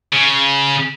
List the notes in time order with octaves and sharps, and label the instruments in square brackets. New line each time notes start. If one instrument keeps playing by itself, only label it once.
[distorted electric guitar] C#3